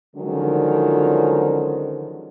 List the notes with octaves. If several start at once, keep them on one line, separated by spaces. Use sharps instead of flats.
D3 D#3 F3 F#3 G#3 C#4